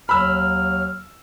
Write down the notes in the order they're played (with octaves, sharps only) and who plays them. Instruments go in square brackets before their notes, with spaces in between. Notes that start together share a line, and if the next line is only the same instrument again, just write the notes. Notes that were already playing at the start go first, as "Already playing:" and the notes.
[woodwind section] D#2 F#3 F6 [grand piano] B5 E6